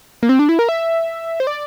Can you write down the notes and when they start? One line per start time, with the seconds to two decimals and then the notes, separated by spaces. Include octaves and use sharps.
0.23 A#3
0.29 C4
0.39 D4
0.49 E4
0.59 A#4
0.69 E5
1.40 C5
1.47 D5